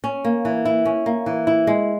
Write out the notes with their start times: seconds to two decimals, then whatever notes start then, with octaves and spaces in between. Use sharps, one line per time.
0.04 C#4
0.25 A#3
0.45 E3
0.65 E4
0.85 C#4
1.06 A#3
1.26 E3
1.47 E4
1.67 G#3